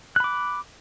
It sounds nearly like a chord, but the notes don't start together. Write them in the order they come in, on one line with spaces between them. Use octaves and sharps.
F#6 B5 D6